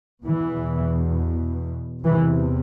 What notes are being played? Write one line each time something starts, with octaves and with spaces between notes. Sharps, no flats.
E2 B2 E3
E2 C3 E3